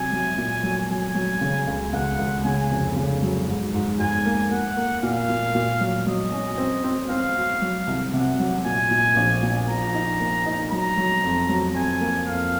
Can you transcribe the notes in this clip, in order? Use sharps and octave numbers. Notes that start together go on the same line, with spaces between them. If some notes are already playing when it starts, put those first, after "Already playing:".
Already playing: C3 F#3 G#5
F#3
A#2
F#3
F#3 G#5
F#3
C#3
C#2
C#2 F#5
C#2
C#3 G#5
F1
C#3
F#3
G#2
G#2
G#2 G#5
A#3
A#3 F#5
A#3
A#2 F5
A#2
A#2
F#3
F#3 D#5
C#4
C4
C4
C4 F5
F#4
F#3
C2
C3 F#5
F#3
A#2 G#5
A#2
A#1
A#2
F3 A#5
D#4
A#3
D#4
F#3 A#5
F#3
F2
F#3
F2 G#5
A#3
F2 F5